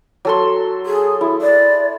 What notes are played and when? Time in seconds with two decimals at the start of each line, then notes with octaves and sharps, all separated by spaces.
0.25 F#3 A4 C6
0.86 G#4
1.21 E4
1.41 D5